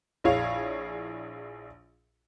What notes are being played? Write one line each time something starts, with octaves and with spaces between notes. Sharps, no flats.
A#1 E4 G#4 C#5 F5 F7